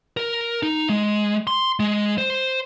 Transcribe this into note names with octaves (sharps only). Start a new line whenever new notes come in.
A#4
D#4
G#3
C6
G#3
C5